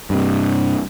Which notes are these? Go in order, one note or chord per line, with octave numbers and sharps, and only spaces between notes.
G2 C3